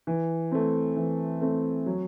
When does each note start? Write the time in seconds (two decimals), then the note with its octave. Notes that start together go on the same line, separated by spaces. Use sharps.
0.07 E3
0.52 A3 C4
0.97 E3
1.42 A3 C4
1.86 F#3